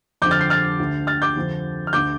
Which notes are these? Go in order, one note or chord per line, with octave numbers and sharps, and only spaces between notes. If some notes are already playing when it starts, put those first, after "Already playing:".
F2 D3 D6 G6
F6 A6
G6 C7
F6 A6
D2 D3
F6 A6
D6 G6
F2 D3
F6
D2 D3 D6 G6